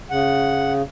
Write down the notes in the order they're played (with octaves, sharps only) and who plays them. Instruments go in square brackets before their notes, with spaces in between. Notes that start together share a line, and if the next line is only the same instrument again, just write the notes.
[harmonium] C#3 F#5